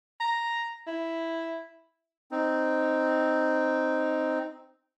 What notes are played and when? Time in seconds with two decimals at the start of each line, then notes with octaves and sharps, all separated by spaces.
0.20 A#5
0.87 E4
2.31 C4 D#4